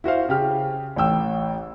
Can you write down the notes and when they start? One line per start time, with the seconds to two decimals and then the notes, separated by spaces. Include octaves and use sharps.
0.04 E4 F#4 C5 F5
0.29 C#3 G4 F6
0.96 A1 A2 G5 E6